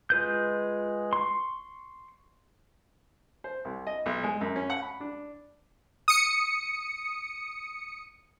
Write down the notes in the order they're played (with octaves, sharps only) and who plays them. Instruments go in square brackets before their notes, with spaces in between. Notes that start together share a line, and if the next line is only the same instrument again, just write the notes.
[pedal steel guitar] G#3 F4 B4 G6
C6 C#6
[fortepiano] C5
C2
D#5
B1
G#3
F#2
C#4
F#5
B5
D4
[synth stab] D#6 C#7